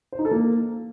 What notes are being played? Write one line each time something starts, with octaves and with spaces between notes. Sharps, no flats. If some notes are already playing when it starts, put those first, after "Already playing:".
C5
D#4
A4
A#3